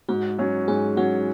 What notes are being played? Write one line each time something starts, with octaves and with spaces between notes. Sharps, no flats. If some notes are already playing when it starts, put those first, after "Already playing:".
G#2 F#4
F#3 C#4
G#2 G#4
F#3 C#4 F#4